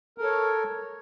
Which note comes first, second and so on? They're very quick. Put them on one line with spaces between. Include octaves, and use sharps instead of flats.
A#4 A4 C#5